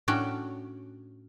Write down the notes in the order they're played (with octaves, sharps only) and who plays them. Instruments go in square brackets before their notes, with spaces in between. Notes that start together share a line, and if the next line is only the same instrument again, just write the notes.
[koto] A2 C#4 D4 F#4 G5